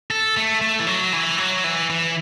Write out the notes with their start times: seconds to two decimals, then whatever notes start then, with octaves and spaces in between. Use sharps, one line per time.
0.10 A4
0.37 A3
0.61 A3
0.79 E3
0.87 F#3
1.13 E3
1.38 F#3
1.64 E3
1.90 E3